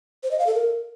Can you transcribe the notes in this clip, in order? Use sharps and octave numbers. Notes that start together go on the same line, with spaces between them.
C5
D#5
F5
A4
A#4